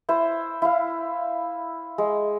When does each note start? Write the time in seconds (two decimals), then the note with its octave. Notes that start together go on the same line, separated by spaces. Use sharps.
0.09 E4 C5
0.62 E4 F5
1.98 G#3